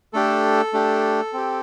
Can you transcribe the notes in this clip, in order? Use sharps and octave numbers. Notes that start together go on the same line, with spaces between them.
A3 D4 G4 A4
A3 D4 G4
C4 G4